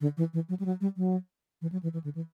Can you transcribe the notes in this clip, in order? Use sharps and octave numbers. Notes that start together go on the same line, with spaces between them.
D3
E3
E3
F#3
G3
F#3
G3
F#3
E3
F#3
E3
E3
D3
E3